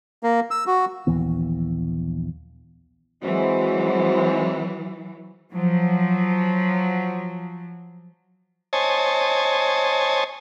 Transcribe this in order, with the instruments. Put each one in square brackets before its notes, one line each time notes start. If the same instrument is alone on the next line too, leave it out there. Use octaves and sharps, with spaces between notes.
[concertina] A#3
E6
F#4
[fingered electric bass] A#1 D#2 E3 B3
[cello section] E3 F#3 [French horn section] G#3 C4 C5 [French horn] F#4
[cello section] F3 F#3
[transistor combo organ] C5 C#5 D#5 G#5 A5